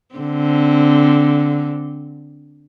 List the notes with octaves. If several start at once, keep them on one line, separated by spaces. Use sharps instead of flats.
D3 C4